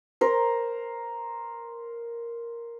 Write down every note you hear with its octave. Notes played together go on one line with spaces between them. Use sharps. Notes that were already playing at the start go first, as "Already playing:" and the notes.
A#4 C5